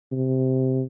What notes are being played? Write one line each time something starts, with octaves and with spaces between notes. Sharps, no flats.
C3